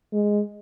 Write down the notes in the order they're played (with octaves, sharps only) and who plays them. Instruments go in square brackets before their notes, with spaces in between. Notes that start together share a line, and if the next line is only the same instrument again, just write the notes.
[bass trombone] G#3